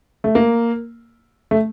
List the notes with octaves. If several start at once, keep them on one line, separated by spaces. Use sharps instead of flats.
A3
A#3
A3